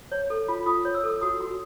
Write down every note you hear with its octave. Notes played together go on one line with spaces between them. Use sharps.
C#5
A4
F4
F4 D#6
C#5
E6
A4
F#4 D#6
F#4